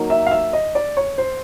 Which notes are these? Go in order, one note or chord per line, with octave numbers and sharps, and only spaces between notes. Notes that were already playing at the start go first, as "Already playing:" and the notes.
Already playing: F#3 A#3 D#4
E5
F5
E5
D#5
D5
C#5
C5